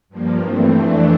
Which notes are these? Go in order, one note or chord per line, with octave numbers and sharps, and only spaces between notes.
G2 F3 A#3
G2 E3 A3 C4
F2 E3 A3 D4